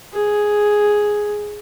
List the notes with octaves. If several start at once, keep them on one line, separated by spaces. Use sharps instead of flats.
G#4